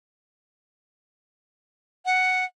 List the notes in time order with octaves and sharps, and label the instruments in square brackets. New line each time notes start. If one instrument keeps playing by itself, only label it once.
[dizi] F#5